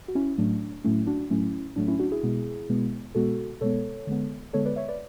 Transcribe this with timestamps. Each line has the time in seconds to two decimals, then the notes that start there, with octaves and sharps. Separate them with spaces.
0.08 F#4
0.15 C#4 E4
0.38 A2 F#3 A3 D4
0.84 A2 F#3 A3 C#4 E4
1.07 D4 F#4
1.31 A2 F#3 A3 C#4 E4
1.76 A2 F#3 A3 D4
1.88 C#4 E4
1.99 D4 F#4
2.12 E4 G#4
2.23 B2 G#3 B3
2.69 B2 G#3 B3
3.15 B2 G#3 B3 F#4 A4
3.61 B2 G#3 B3 A4 C#5
4.07 D3 G#3 B3
4.53 D3 G#3 B3 A4 C#5
4.65 B4 D5
4.76 C#5 E5
4.88 B4 D5